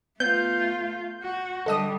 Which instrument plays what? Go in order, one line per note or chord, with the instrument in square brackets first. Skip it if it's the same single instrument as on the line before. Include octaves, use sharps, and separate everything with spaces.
[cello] A3 F4 [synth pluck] B3 [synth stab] G6
[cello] F#4
[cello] D3 G3 [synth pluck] A4 D#5 D#6